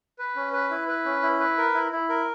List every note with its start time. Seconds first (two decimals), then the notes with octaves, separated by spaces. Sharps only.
0.19 B4
0.36 C#4
0.53 B4
0.71 E4
0.88 B4
1.05 C#4
1.22 E4
1.40 B4
1.57 A#4
1.74 E4
1.92 E4
2.09 A#4